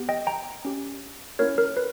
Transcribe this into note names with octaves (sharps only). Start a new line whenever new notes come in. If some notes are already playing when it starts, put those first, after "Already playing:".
Already playing: B3 G4
D#5 G5
G5 A#5
C#4 G4
A#3 C#4 E4 A#4 C#5
A#4
B4